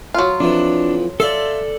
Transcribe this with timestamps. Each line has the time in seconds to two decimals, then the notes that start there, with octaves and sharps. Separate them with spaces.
0.14 F#3 F4
0.40 F2 E3 D4
1.20 A4 D5 E5 F5 C6